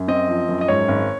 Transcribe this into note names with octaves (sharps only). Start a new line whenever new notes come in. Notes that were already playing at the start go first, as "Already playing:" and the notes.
Already playing: F#2
C4 D#5
F3
F#2
D#5
G#2 C#5
G#1